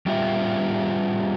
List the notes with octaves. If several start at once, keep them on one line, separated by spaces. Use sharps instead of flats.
G3 C4 F4 G4 E5